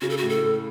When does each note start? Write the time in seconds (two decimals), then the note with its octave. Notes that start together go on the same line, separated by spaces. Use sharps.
0.01 C#3 F#4
0.10 A4
0.17 F#4
0.22 A2
0.29 A4
0.43 A2